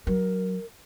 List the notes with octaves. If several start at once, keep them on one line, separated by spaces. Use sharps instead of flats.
F#3 A#4